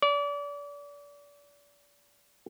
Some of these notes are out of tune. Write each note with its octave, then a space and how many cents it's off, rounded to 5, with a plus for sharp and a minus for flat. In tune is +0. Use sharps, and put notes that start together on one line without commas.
D5 -35